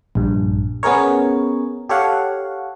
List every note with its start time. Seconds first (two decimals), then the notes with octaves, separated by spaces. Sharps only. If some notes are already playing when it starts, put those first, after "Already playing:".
0.15 A#1 G2
0.83 B3 C#4 G#4 A#4 C#5
1.89 G4 A4 C#5 F5 F#5